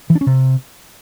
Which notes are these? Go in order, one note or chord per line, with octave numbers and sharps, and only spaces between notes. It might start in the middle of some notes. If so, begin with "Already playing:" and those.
E3
D4
C#4
C3